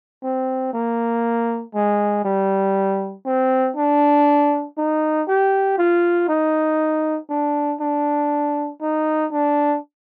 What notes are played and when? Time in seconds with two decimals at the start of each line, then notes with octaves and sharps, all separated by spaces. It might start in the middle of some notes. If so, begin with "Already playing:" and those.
0.23 C4
0.74 A#3
1.75 G#3
2.25 G3
3.26 C4
3.76 D4
4.78 D#4
5.28 G4
5.78 F4
6.29 D#4
7.30 D4
7.81 D4
8.82 D#4
9.32 D4